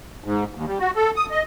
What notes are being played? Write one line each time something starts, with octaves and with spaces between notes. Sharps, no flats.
G#2
D#2
G3
F#4
A4
D#6
D#5